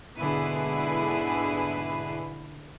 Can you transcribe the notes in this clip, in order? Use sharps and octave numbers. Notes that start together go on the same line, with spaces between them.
G#2 B2 D3 E4 G#4 B4